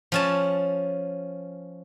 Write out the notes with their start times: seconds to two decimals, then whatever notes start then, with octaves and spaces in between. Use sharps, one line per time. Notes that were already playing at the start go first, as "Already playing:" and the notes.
0.12 F3 C#4 A5